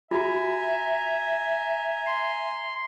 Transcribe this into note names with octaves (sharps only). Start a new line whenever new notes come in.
F4 F#4 E5 G#5 A#5
C6